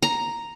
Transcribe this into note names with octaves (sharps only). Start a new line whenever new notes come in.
A#5